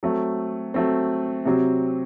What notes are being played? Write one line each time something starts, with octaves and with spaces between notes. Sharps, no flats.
F#3 A3 C4
F#3 A3 C4
C3 F#3 C4